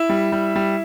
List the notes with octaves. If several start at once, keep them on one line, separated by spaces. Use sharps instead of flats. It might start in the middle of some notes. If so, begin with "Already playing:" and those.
Already playing: E4 E5
G3
G3
G3